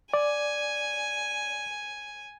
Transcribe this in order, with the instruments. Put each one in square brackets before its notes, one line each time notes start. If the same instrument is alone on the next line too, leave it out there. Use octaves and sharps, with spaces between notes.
[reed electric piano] D5 [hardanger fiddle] G#5